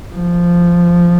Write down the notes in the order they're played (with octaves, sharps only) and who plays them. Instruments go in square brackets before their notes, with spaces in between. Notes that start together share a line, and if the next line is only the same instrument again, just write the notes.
[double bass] F3